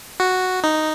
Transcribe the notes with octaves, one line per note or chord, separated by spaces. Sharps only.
F#4
D#4